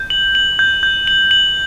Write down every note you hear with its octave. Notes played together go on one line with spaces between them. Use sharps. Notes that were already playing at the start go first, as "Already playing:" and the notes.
Already playing: G6
F#7
F#7
G6
G6
F#7
F#7